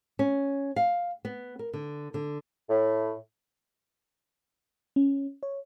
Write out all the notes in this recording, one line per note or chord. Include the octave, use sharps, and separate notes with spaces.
C#4
F5
B3
A#4
D3
D3
A2
C#4
C#5